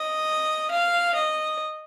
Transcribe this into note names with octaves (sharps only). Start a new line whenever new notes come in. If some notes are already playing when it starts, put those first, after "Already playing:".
Already playing: D#5
F5
D#5